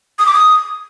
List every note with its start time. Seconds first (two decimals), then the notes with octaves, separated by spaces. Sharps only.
0.19 D#6
0.26 D6
0.33 D#6